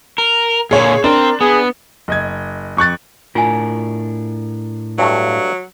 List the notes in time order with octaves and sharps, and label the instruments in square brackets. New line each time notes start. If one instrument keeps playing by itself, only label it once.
[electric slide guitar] A#4
[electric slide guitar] A#2 D3 [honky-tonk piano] G#4 C#5
[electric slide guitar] C4 [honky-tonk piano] D4 [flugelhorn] A#4
[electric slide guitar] B3 [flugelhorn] G#4
[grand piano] F#1 D#5 G#6
F2 C#6 F#6 A6
[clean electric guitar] A2 D4 A#4 [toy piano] F4 G#5
[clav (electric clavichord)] G2 A3 [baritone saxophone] F#3